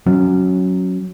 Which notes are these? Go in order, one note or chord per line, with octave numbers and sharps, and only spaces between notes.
F#3 C#4